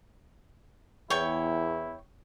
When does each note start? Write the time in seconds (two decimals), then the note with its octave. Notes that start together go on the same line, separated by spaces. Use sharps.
1.10 E2 E4 C#5 G5 C#6